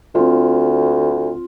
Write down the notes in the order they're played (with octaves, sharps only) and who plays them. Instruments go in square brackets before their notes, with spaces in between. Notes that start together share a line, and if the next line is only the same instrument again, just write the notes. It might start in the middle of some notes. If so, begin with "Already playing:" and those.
[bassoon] D2 [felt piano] C4 F4